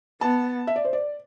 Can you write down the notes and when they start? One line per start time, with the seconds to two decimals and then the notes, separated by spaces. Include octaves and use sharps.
0.21 B3 A5
0.67 E5
0.76 D5
0.85 C5
0.93 D5